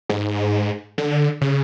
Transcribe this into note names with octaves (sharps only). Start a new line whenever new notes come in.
G#2
D3
C#3